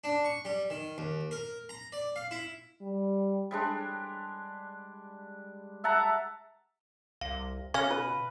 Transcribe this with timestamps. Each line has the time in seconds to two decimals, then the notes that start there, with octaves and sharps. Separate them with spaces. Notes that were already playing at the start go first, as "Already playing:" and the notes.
0.04 D4
0.25 C#6
0.45 G3
0.70 D#3
0.98 D#2
1.31 A#4
1.69 A#5
1.92 D5
2.16 F5
2.31 E4
2.82 G3
3.51 G3 G#3 D4
5.84 E5 F#5 A5 A#5
7.21 C2 F5
7.74 B2 C#4 F5 G#5 F6
7.91 B4